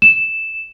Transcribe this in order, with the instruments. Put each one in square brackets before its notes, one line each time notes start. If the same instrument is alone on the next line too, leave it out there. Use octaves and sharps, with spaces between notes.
[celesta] E7